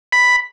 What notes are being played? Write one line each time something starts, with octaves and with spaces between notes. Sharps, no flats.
B5